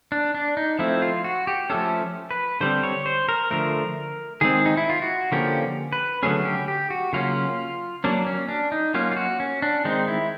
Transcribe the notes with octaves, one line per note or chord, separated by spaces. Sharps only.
D4
D4
D#4
F3 A3 C4 E4
F4
F#4
G4
F3 A3 C#4 A4
B4
D3 G3 C4 C5
C#5
C5
A#4
D3 F3 A3 A#4
D#3 G#3 C4 G#4
D#4
E4
F4
F#4
D3 F3 A#3 C#4 G4
B4
D3 F#3 A3 C#4 G#4
G4
G4
F#4
C#3 F#3 A#3 C#4 F4
F#3 A#3 C#4 D4
C#4
D4
D#4
F#3 A#3 C#4 F4
F4
F#4
C#4
D4
D#3 G#3 C4 D#4
E4